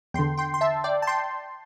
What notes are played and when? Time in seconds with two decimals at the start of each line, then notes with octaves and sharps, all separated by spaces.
0.14 E2 D3 G5 C6
0.37 G5 C6
0.54 C6
0.61 E5 A5
0.84 D5 G5
1.02 A5
1.07 G5 C6